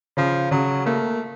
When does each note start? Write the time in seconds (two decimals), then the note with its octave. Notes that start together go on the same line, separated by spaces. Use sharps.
0.17 C#3 F3
0.51 C#3 F#3
0.86 A3 A#3